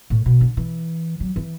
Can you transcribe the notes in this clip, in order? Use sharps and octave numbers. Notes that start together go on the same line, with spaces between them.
A2
B2
D3
E3
F#3
E3